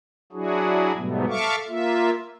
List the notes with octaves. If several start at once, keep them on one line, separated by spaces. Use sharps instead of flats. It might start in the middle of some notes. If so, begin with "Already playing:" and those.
F#3 D4 E4 F#4 G#4
G#2 B2 F#3 G3 A3 B3
A4 E5 F5 C#6 D6
A#3 F4 E5